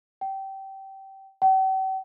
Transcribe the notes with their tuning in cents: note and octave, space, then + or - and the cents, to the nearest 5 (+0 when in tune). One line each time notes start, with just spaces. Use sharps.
G5 -20
G5 -45